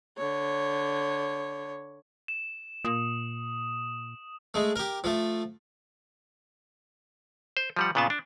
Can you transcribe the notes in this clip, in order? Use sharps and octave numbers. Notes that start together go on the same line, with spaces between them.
D3 C#5
E7
A#2 D#6
G#3 A3
G4 A#4
F3 A3
C5
F3 G3 F#5
A#2 C#3 B3 F4 A5
D4